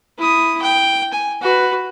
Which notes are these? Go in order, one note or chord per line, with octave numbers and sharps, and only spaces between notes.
E4 D#6
G5
G#5
F#4 B4